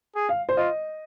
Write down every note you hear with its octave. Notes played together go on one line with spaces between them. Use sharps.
G#4
F5
C5
F4 D#5